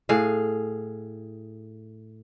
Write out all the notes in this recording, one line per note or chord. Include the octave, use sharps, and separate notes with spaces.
A2 G#4 F5